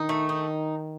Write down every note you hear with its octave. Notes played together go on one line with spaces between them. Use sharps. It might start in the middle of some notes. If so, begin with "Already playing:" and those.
Already playing: D#3 D#4
A3
D#4